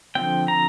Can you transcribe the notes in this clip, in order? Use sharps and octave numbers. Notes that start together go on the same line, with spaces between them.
D3 F3 C4 G5
A#5